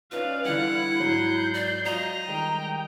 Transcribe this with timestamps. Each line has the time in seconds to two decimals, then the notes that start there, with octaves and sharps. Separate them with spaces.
0.12 C#4 D#4 F4 B4 D5 F5
0.45 D3 E3 G3 E4 F#5
0.99 G#2 F#3 G6 C7
1.54 D5
1.85 F#3 F4 D#5 A#5
2.28 D#3 G3 G#3 G5